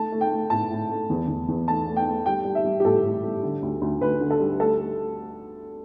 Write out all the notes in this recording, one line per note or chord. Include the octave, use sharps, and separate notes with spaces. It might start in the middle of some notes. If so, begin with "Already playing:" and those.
Already playing: A3 A5
A3
G5
A3
A2 A5
A2
A3
E2
E2
E2
A3 A5
A3
G5
A3
G3 G5
G3
E5
G3
G4
A2 A4
A2
G3
D3
D2
D2
D2 B4
D3
A4
G3
A3 A4
A3